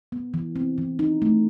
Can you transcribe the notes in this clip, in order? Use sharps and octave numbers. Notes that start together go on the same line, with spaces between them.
B3
E3
C4
E3
D#4
A3